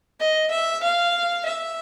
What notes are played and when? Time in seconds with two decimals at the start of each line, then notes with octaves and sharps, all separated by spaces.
0.20 D#5
0.51 E5
0.83 F5
1.45 E5